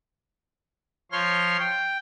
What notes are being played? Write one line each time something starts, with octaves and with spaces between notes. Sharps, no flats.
F3 C#5 C6 F6
G5